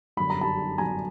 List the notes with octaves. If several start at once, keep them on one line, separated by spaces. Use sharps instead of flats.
G1 F#2 D3 B5
A#5
A5 B5
G1 F#2 D3 G#5 A#5